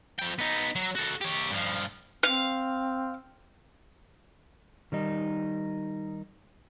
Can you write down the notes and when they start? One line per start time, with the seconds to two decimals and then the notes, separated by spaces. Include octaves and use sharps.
0.19 F3 G5
0.39 B3 D#4
0.76 F#3
0.95 F#4 A4
1.21 G4 C#5
1.51 G2 F3
2.23 C4 F5
4.92 D#3 G3 D#4